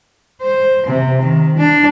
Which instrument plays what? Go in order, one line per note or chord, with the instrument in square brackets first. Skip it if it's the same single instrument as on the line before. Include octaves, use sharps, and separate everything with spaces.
[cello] C5
C3
D#3
D4